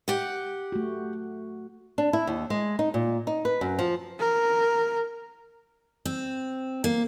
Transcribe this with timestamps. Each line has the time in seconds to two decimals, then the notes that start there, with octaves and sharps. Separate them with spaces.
0.08 G4 F#5
0.72 A3 F#4
1.98 D4
2.13 E4
2.27 D#2
2.50 G#3
2.79 D#4
2.94 A#2
3.27 D#4
3.45 B4
3.61 F#2
3.79 F3
4.19 A#4
6.05 C4
6.84 A#3